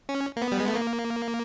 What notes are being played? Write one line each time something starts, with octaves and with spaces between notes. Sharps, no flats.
C#4
A#3
B3
G3
G#3
A3
A#3